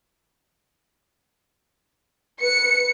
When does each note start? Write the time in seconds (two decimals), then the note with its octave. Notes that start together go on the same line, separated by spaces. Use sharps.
2.41 B4 C#7